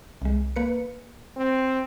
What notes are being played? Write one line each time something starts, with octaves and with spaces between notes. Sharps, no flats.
C2 G#3
A#3 B4 C#7
C4